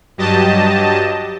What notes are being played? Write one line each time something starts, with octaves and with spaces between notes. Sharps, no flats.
G2 F#3 G4 D#5 A5